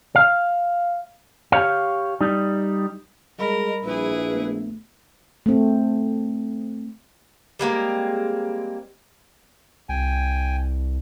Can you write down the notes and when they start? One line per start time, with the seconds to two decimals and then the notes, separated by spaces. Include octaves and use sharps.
0.16 F5
1.52 G4 C#5 F5
2.21 G3 D#4
3.39 G3 G#3 A#4 D#5 B5
3.84 A#1 E4 G#4 B4
4.34 A3 B3
5.46 A3 C4
7.59 G3 G#3 A#3 C4
9.89 C2 G5 G#5